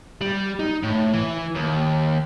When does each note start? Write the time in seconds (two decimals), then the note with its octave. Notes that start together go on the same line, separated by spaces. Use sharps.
0.21 G3
0.60 D#4
0.83 A2
1.13 E3
1.55 D#2